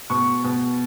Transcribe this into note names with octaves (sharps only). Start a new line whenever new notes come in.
B2 C#6
B2